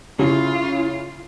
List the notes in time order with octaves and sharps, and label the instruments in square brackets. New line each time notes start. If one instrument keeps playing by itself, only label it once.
[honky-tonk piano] C#3 [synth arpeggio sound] C#4 E4 [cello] F4